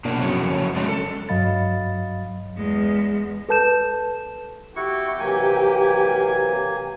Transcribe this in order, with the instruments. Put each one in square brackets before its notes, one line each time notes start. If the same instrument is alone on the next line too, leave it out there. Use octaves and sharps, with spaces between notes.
[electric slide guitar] B2 A#3 D4
F2 C#3 F#3 C#4
F#3 G#3 C#4 D4
A4
[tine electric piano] G2 F#3 D#5 F5 B5 A6
[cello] E2 G#3
[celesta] A4 B4 A5 G6 E7
[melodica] E4 F#4 C#6 [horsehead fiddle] G4
[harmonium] C3 E3 F#3 [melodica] A#3 G#5